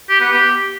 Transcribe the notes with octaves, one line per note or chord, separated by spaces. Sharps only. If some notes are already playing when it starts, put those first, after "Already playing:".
G4
B3
G4